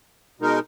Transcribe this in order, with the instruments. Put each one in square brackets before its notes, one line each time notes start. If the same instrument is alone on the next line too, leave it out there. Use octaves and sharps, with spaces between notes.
[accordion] B2 G#3 D#4 A#4